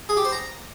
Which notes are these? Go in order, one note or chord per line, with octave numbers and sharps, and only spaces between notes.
G#4
G4
C5
A#5